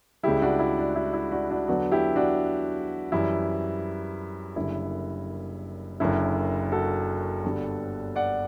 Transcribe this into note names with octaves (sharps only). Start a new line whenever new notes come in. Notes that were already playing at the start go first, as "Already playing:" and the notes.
C#2 C#3 G3 E4 G4
D4 F#4
E4
D4
E4
E4
D4 F#4
D4 F#4
E2 D3 F#3 B3 D4 F#4
E4 G4
D4 F#4
F#2 E3 G3 E4
F#1 F#2 D3 G3 E4
F#1 F#2 D3 E4
F#4 A4
G1 G2 D3 G3
D5 F#5